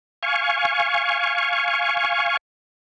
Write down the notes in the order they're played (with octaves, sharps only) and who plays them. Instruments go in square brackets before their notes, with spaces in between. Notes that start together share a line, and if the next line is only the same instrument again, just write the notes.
[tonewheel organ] F5 G#5 C#6